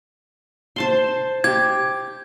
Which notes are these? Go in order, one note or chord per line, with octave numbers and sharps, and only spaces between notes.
C5 A5 C6
G4 G#6